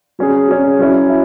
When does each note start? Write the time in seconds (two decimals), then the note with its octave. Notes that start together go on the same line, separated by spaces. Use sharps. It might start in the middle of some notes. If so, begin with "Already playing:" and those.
0.19 F#3 C#4 G#4
0.49 F#3 C#4 G#4
0.79 F#3 C#4 E4
1.10 E4